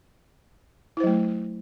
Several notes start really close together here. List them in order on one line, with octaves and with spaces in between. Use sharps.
E4 C5 F#3 A3